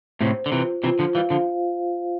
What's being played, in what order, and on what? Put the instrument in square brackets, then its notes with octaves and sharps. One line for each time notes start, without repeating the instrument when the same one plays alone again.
[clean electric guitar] A2 C3 [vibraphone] C5
[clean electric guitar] D3
[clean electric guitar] C3 E3 [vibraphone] F4
[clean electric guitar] C3 E3 [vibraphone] F4
[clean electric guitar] D3 F3
[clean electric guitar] E3 G3 [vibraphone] F5
[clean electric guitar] D3 F3